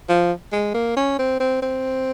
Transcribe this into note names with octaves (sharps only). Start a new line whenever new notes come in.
F3
G#3
A#3
C#4
C4
C4
C4